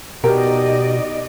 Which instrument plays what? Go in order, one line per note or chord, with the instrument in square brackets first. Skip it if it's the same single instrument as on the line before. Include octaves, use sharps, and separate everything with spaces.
[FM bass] B2 [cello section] D#4 D5 D#5 [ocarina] G4 [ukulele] A#4 G5 A#5